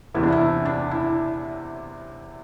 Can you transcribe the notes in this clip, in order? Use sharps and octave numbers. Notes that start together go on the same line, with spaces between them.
E2 C3 E3 E4
D4
E4
D4
E4